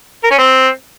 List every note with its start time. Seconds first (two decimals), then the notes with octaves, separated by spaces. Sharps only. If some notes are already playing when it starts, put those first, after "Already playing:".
0.24 A#4
0.31 C#4
0.38 C4